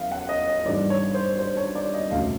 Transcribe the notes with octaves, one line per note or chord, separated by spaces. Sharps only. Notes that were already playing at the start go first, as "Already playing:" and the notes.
Already playing: F#1 E2 E5 F5
F#5
D#5
D#5
G#1 G2 E3 D5
C#5
C5
C5
C#5
D5
D#5
E1 D2 C#3 F5